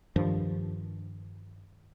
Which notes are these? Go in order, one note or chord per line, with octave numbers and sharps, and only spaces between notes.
G2 D#3 F3